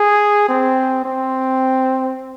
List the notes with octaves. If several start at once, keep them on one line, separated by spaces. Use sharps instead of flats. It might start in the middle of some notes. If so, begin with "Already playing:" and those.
Already playing: G#4
C4
C4